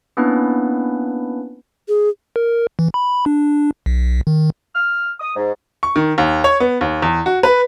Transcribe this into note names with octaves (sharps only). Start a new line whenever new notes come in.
A#3 B3 C#4 D4 E4 B4
G#4
A#4
E3
B5
D4
B1
D#3
F6
D#6
G#2
C#6
D#3
D#2
C#5
B3
D#2
E2
F#4
B4